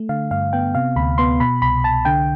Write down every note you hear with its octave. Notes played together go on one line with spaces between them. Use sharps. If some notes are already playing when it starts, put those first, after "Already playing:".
Already playing: A3
D3 F5
G2 F5
B3 G5
C3 F5
D2 B5
B3 C6
B2 B5
C2 B5
C2 A5
D3 G5